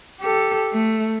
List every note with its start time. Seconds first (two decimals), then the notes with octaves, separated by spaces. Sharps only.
0.21 G4 A4
0.73 A3